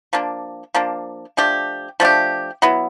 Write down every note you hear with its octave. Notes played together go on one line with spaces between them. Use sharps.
F3 A#3 D4
F3 A#3 D4
F3 A3 D4 G4
F3 A3 D4 G4
F#3 B3 E4